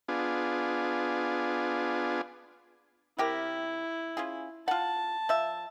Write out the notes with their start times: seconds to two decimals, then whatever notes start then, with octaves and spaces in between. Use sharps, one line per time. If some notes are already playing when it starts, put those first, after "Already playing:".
0.08 B3 D4 F4 G#4
3.18 C3 E4 G4 A#4
4.17 C#4 F4 G#4
4.68 F4 F#5 A5
5.29 F3 E5